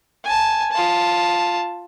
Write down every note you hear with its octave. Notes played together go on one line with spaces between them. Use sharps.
G#5 A5
F4 A5